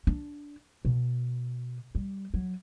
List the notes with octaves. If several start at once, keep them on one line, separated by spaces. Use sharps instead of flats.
D4
B2
G3
F#3